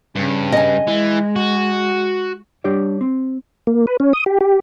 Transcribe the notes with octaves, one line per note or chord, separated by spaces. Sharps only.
G2 C#3
D#5 G#5
E3 G#3
F#4
G3 D4 G4 C#5 D5
C4
A#3
B4
C#4
D#6
G4
G4